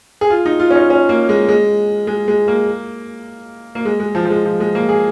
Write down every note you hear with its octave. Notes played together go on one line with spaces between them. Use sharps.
G#4
F4
D#4
F4
C#4
D#4
C#4
A#3
G#3
G#3
G#3
G#3
A#3
A#3
G#3
G#3
F3
F3
G#3
F3
G#3
A#3
G#4